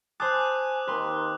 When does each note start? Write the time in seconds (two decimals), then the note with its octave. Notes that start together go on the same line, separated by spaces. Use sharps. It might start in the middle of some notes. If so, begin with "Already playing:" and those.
0.20 C5 G#5 A5 D6 D#6 F#6
0.88 D#2 D#3 C4 B4 C6